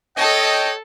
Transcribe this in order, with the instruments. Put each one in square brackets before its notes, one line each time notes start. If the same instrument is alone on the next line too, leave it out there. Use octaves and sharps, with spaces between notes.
[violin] A4 A5 [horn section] C#5 D#5 G5